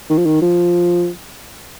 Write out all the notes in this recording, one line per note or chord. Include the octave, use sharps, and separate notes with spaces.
D#3
F3
D#3
F3